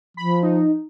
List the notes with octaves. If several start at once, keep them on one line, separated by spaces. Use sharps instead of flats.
F3 B5
D#4